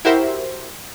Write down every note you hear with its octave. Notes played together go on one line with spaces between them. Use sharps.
E4 F#4 G4 A#4 C5 E5